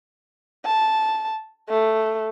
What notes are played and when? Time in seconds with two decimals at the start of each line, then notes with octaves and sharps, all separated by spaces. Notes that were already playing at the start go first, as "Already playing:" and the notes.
0.65 A5
1.69 A3